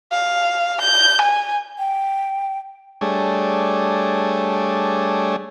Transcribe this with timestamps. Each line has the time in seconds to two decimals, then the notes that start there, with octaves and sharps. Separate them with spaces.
0.12 F5
0.82 G6
1.22 G#5
1.79 G5
3.01 G3 A3 D4 G#4 C#5